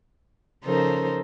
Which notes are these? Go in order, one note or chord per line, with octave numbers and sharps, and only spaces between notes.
C#3 F3 D#4 A4 A#4 C5